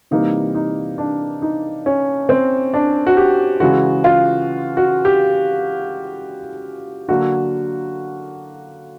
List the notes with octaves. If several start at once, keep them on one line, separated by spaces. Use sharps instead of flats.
C3 E3 G3 A#3 D#4
D#4
D4
D#4
C#4
C4
D4
F#4
G4
C#3 E3 G#3 F#4
F4
F#4
G4
D3 F#3 A#3 F#4